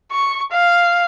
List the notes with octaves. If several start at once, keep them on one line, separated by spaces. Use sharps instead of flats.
C#6
F5